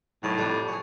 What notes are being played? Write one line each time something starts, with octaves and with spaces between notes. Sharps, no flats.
B1 A2 D#5
F2 G3 D4
G#4 C#5